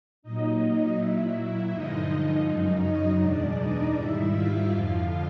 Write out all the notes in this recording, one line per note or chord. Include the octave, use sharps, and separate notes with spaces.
A#2 F#3 D#4 D#5
A#2 F#3 E4 E5
G2 D3 F3 G#3 D#4 D#5
F#2 C#3 F#3
E2 B2 G#3 D4 D5
D#4 D#5
G#2 D#3 G3 E4 E5
F4 F5
F2 D3 F3